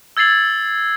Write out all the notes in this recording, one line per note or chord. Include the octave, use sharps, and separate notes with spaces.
E6 G#6 A6 C7 F#7